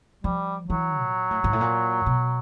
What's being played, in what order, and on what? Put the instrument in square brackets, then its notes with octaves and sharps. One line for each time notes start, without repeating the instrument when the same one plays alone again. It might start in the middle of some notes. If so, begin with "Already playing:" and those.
[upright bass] F3 [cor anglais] G3
[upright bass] E3 [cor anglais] F#3
[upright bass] A#2
A2
G#2
A2
A#2
B2